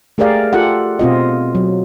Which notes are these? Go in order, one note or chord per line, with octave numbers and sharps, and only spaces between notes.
A3 G4 G#4 A#4 D5 F5
F4 G4 A4 F#5
B2 C4 F4 D#5
F#3